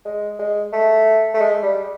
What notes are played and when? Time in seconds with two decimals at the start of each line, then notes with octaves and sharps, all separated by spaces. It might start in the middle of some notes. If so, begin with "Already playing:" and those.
0.05 G#3
0.39 G#3
0.73 A3
1.34 A3
1.41 G#3
1.63 G3